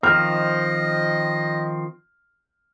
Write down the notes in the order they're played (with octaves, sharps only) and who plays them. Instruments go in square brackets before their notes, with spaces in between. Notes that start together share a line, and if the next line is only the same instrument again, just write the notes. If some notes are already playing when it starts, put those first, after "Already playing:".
[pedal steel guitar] D#3 F3 C4 [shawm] D#5 [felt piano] F6